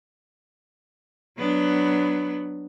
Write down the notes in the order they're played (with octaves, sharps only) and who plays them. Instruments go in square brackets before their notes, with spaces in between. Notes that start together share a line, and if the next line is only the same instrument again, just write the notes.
[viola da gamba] F#3 B3 D4